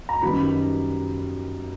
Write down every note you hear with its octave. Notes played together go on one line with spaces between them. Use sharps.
A#5
F#2 D#3 G3 B3 D#4 B5